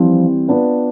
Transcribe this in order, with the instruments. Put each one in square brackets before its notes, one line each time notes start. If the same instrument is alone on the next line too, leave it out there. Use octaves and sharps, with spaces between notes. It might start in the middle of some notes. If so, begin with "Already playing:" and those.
Already playing: [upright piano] E3 G3 C4 [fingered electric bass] F3
[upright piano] B3 D4 F4 B4 D5